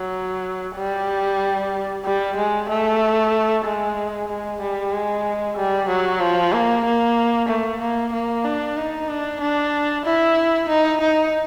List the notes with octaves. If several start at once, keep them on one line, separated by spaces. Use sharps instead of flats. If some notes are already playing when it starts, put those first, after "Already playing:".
Already playing: F#3
G3
G3
G#3
A3
G#3
G#3
G3
G#3
G3
F#3
F3
A#3
A#3
A3
A#3
A#3
D4
D#4
D4
D4
E4
D#4
D#4